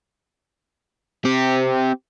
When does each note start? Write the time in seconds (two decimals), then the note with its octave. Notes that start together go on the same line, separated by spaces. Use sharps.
1.25 C4 G4